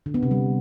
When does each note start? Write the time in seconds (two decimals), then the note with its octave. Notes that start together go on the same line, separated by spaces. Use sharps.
0.06 D3
0.14 B3
0.23 C3
0.31 G3